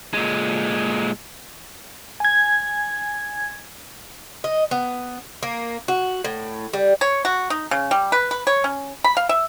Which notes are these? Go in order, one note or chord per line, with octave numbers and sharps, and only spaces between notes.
A#2 G#3
G#5 G#6
D#5
B3
A#3
F#4
A2
G3
C#5
F#4
D#4
C#3
G3
B4
B4
C#5
C#4
B5
F5
E5